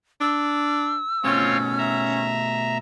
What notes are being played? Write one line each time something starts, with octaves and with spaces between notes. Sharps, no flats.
D4 E6
B2 A3 C4 C#4 F4 C#5
E5 A#5